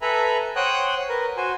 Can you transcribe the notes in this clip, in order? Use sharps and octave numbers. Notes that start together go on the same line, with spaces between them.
A4 B4 E5 G#5 A#5 B5
C5 C#5 F#5 G5 D#6 F#6
A#4 B4
F#4 C5 G#5